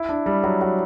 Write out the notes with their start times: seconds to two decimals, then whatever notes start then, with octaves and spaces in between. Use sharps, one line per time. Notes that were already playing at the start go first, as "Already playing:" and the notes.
Already playing: E4
0.09 D4
0.26 G3
0.44 F#3
0.61 F#3